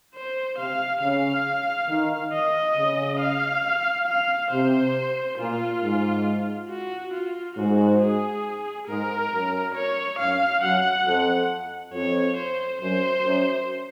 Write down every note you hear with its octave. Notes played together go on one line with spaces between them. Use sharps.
C5
C3 F5
C#3 F5
D#3
D#5
C#3
F5
F5
C3 C5
A#2 F4
G#2
F#4
F4
G#2 F#4
G#4
G#2 A#4
F#2
C#5
F#2 F5
F#2 F#5
F2
F2 C#5
C5
F#2 C5
F#2